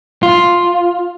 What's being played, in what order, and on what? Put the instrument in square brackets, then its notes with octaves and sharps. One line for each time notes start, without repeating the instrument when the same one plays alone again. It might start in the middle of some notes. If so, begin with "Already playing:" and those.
[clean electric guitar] F4